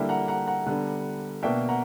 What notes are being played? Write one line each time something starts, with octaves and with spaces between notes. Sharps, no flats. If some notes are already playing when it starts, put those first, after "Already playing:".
Already playing: D3 G3 A#3 E4 E5 G5
F#5 A#5
F#5 A#5
F#5 A#5
D3 G3 B3
B2 A#3 D4 E5 G5
F#5 A#5